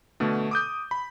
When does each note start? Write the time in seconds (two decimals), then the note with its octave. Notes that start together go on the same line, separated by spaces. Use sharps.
0.20 B2 D3 A3
0.51 D6 D#6 G6
0.91 B5